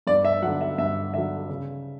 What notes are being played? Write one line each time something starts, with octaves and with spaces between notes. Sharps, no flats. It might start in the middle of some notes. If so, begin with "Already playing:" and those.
G2 D5
E5
D3 F#3 F#5
E5
G2 E5
D3 F#3 E5
C#3